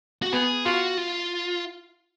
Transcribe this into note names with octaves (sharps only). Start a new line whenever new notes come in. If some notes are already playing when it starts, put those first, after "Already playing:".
F#4
B3 G#4
F4 F#4
F4